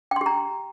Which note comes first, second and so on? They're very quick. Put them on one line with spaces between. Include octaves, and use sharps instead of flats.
G5 C6 G4 A#5